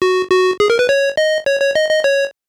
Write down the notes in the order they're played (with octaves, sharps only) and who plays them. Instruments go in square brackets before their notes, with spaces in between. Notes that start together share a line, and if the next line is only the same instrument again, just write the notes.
[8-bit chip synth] F#4
F#4
G#4
A#4
B4
C#5
D#5
C#5
C#5
D#5
D#5
C#5